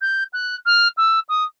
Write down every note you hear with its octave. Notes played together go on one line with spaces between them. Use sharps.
G6
F#6
F6
E6
D#6